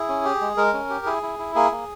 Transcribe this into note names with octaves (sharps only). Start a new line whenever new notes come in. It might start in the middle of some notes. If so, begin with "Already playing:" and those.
Already playing: E4 G#4
C#4
G4
G#3
G#3 A#4
C#4
G4
E4 G#4
E4
E4
A#3 G#4
A#3